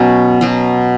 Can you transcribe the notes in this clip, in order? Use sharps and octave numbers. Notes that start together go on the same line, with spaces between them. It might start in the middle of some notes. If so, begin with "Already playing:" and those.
Already playing: B2 F#3 B3 C#4
B2 F#3 B3